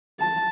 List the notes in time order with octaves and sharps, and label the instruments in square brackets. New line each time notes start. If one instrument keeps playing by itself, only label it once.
[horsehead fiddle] A5